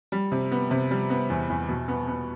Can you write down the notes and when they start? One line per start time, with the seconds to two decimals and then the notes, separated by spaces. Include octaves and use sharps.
0.12 G3
0.32 C3
0.51 B3
0.71 C3
0.91 G3
1.10 B3
1.30 E2
1.50 E2
1.69 B2
1.88 B3
2.08 B3